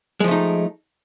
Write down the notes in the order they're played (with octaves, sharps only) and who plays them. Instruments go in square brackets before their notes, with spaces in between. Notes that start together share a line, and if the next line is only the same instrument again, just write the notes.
[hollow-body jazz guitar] G#3
F3
A3
D#4